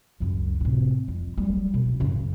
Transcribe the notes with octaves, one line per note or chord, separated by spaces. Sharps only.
C#2 F#2
A2 C3
F2
F#3 G3
B2
F#2 C#3